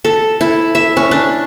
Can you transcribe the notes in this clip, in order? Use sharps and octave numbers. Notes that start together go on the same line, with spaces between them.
A4
E4
E5
C#4
D4